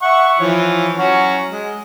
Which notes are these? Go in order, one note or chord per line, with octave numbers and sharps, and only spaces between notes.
E5 F#5 C#6
E3 F3 C#5
F#3 C#4 F#4
G#3